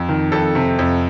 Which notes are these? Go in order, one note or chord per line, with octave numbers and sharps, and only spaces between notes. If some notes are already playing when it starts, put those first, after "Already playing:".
Already playing: F2
D#3
F2 A4
C3
F2